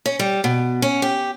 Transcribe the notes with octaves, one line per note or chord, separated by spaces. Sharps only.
C#4
G3
B2
C#4
G4